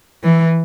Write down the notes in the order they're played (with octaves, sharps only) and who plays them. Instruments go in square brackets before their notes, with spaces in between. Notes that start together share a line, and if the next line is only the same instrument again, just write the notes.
[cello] E3